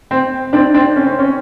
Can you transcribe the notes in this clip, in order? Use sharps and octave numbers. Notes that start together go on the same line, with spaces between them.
C4
C4 D4
C4 D4
C#4
C4
C#4